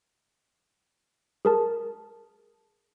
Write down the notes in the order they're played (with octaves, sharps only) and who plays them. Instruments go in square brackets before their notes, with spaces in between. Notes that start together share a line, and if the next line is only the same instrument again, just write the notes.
[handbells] G#4 A#4 A5